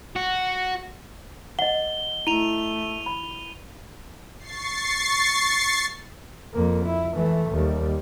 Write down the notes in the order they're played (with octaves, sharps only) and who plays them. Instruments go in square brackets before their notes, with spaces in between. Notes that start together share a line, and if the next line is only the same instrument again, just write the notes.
[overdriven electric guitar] F#4
[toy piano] D#5 F#5 [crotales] G7
[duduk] A3 [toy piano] E4 [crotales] D#7 F7
[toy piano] B5
[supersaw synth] C#6 A6 C7
[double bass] F2 A#3
E4
E3 A3
D#2 G3